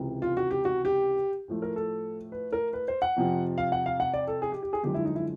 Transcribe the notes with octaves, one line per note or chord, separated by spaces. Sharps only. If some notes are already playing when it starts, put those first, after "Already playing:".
Already playing: C#2 C3 E3
F4
F#4
G4
F#4
G4
A2 F3 A3
A#4
A4
B4
A#4
B4
C5
F#5
F2 C3 F3
F5
F#5
F5
F#5
D5
A4
G#4
G4
G4
G#4
F#2 D3 F3 G#3 G4
E4
D#4
E4